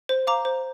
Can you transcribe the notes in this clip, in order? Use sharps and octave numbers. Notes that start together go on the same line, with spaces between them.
C5
F5 A#5 D6
C5